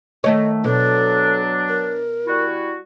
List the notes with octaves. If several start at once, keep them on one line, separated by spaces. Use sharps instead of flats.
D#3 A3 C#5 D#5
B2 F#3 D4 A4
A#4
G3 E4 F#4